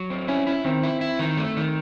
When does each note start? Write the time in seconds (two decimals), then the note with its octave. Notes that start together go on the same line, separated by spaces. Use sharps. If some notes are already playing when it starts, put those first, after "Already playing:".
Already playing: F#3
0.10 C4
0.28 C#4 E4
0.47 E4
0.65 D#3 C4
0.83 E4
1.01 E4
1.19 D#3
1.37 A3
1.57 D#3